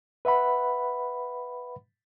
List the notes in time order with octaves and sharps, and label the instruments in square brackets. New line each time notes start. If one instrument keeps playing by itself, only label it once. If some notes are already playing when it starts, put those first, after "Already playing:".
[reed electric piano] B4 E5 F#5 B5